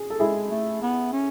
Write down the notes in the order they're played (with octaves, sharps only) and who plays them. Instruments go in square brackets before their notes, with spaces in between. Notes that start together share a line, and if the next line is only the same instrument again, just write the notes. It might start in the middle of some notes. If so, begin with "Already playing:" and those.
Already playing: [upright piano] G#4
A4
[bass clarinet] G#3 [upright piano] E4 G#4
[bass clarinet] A3
B3
C#4